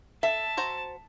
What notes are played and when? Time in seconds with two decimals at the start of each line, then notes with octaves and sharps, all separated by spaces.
0.23 A4 E5 A5
0.57 F#4 C5 A#5